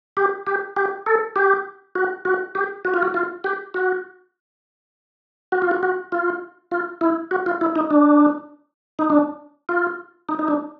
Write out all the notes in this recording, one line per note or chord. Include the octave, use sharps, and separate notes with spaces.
G4
G4
G4
A4
G4
F#4
F#4
G4
F#4
F4
F#4
F4
G4
F#4
F#4
F4
F#4
F#4
F4
F4
E4
F#4
F4
E4
D#4
D4
D#4
D4
F4
D#4
D#4
D4